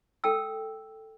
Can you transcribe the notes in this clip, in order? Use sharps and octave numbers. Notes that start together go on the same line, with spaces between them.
A4 G5 E6